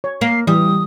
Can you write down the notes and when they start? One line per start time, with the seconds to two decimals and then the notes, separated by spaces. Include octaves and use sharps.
0.04 C#5
0.21 A#3 C7
0.47 E3 G3 D#6